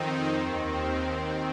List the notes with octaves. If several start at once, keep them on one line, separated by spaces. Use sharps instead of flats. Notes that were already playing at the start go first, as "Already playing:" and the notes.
Already playing: F2 D#3 C4 D#4
D#2 D#3 C4